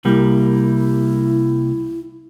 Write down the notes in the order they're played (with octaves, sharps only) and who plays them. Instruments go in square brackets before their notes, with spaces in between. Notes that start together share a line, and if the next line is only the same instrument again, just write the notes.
[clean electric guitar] C2 G3 A#3 [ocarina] E4